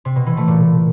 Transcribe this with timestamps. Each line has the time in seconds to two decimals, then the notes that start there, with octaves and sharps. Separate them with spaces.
0.05 C3
0.16 B2
0.26 E3
0.37 A3
0.48 A#2